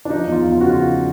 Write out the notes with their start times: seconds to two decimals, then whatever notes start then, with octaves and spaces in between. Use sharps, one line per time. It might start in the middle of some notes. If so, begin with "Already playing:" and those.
0.05 D4
0.10 F3 D#4
0.27 E2
0.32 F4
0.42 E2
0.52 F4
0.57 C#3 F#4
0.69 F3 F4